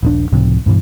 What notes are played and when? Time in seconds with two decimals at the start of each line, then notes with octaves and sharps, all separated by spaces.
0.03 D#1 A#1 D4
0.32 C#2 A2 C3 F3
0.66 G2 B2 D#3 E3